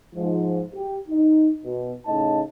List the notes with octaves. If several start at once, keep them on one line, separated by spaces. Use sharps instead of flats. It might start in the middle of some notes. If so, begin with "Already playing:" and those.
G#2 F3
G4
D#4
B2
A2 C#3 D#4 D#5 A5